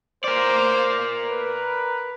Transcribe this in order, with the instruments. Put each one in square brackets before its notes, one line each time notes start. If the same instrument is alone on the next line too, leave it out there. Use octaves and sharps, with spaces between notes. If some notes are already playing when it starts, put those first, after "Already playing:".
[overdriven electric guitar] A#4 D5 [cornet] C5
[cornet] B4